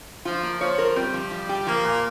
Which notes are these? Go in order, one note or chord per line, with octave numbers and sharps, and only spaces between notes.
F3 F4
A#3
F3 C#5
A#4
G3 C4
F3
F3
G4
F3 A#3
A#2